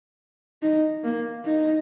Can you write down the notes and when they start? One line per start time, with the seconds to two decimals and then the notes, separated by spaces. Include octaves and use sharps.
0.62 D#4
1.04 A#3
1.45 D#4